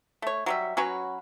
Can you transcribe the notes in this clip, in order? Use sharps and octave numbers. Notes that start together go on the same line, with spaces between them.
A3 C#5
F#3 G3 E5
F#3 C#4 F#4 B4